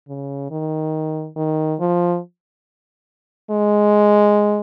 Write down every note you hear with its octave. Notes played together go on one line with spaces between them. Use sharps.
C#3
D#3
D#3
F3
G#3